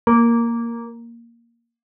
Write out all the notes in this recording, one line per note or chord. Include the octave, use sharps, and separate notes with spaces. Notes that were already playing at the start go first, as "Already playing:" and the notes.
A#3